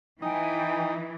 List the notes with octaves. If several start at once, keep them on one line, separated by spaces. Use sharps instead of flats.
E3 D#4 G5 G#5